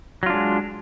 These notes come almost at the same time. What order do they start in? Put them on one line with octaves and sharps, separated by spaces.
F#3 F4 D4 G#3